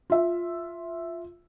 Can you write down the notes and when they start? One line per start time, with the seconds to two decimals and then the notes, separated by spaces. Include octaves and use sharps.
0.10 F4 E5